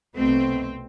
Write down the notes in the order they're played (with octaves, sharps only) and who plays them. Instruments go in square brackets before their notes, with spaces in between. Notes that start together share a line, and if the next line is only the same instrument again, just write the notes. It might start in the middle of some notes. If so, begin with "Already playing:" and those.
[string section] C2 B2 A3 C4